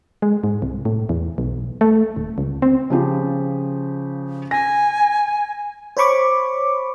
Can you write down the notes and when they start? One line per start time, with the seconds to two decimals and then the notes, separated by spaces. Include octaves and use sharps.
0.22 G#3
0.44 G#2
0.62 C2
0.85 A2
1.09 E2
1.38 B1
1.81 A3
2.17 D#1
2.38 C#2
2.62 C4
2.90 C#3 F3 G4
4.51 G#5 A#6
5.97 C5 C#5 B5 C#6 D6